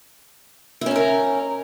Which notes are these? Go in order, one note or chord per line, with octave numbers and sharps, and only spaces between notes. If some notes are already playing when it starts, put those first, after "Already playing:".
C#4 D#4 E4 A#4